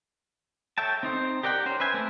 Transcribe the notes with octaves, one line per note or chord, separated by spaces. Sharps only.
A4 C#5 E5 G5 A5
C4 D#4 C5
G4 A#4 D5 F#5 G5
C#4 C5
B4 C5 E5 G#5
A3 A#3 C4 A4 A#4